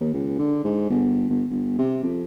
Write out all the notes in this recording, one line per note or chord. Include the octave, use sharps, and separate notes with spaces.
D#2
C#2
D3
G#2
G1
G1
G1
C3
F2